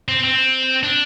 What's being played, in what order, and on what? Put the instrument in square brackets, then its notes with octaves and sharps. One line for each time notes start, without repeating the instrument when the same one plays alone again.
[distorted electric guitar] C4
C4
D4